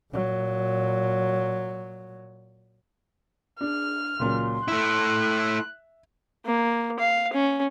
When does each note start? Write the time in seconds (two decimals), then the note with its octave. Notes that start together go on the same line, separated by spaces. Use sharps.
0.12 A#2 F#3
3.61 D4 G#4 F6
4.19 C#2 A#2 F#3 C6
4.68 A3 E4 E5 F#6
6.46 A#3
6.99 F5
7.33 C#4